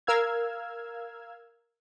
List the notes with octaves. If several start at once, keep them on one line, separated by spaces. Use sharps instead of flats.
A#4 F5 E6 F6 G#6